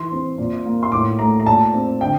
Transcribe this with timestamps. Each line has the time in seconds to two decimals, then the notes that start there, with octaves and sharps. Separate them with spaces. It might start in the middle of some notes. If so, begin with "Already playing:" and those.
Already playing: E3 C6
0.12 C4
0.38 A#2
0.66 A#3
0.83 C6
0.92 A2 D6
1.19 A3 A#5
1.40 A#5
1.46 A#2 A5
1.74 C4
2.01 D3 G5